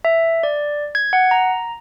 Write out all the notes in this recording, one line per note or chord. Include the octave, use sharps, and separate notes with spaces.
E5
D5
G#6
F#5
A#5